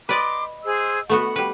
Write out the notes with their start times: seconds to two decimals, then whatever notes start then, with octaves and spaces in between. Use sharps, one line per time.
0.09 B4 D5 D#5 C6 D6
0.64 G#4 C5 E6
1.09 A3 B3 F#4 F#5
1.36 G3 B4